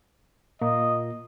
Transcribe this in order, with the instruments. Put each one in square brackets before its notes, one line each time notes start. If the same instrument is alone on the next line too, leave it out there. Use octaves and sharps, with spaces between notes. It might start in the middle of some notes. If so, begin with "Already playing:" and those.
[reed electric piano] A#2 A#3 F4 [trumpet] D#5